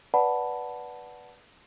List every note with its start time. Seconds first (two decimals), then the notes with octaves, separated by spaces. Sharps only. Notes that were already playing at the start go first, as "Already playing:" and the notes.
0.14 B4 D5 F#5 A5 B5